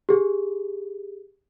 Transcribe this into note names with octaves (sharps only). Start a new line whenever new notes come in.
G4 G#4